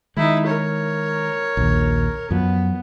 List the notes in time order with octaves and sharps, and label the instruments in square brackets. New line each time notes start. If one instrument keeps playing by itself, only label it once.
[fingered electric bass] D#3 G#3 [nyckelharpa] D#4 E4
[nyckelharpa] A#4 C#5
[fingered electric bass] A#1 D#2
[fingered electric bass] F#2 F3 [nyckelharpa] B3